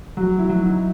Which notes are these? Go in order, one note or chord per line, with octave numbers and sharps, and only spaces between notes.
F#3 F#4
E4
F#3
D#4